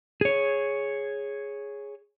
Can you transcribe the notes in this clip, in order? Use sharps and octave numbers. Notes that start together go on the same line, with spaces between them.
G#4 C#5